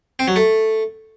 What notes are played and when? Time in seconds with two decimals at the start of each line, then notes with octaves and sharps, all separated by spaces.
0.19 C4
0.28 F#3
0.36 A3